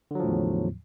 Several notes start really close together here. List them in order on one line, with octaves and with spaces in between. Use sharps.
D3 F#3 F3 A2 E2